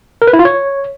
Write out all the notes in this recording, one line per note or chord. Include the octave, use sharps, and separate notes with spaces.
A#4
B4
E4
F4
C#5